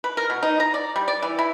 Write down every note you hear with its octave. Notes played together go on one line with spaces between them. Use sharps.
B4
A#4
B2
D#4
A#5
D5
G3
D5
E3
E4